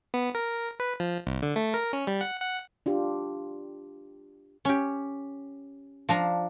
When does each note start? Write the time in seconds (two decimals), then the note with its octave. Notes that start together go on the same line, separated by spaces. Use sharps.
0.14 B3
0.35 A#4
0.80 B4
1.00 F3
1.27 C2
1.42 D3
1.56 A3
1.74 A#4
1.93 C#4
2.07 G3
2.21 F#5
2.41 F#5
2.86 D4 F4 G4
4.65 C#4 G4
6.09 F3 D4 A#5